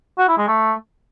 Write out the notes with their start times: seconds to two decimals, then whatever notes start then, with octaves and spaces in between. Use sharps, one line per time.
0.18 F#4
0.28 E4
0.38 G#3
0.48 A3